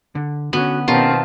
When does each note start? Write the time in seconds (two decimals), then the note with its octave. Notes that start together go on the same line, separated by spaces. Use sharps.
0.15 D3
0.53 D3 B3 C#4 F#4
0.88 B2 D#3 C4 C#4 F4 G4 A#4 A5